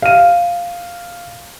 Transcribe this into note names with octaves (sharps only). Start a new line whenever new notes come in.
F5 D#7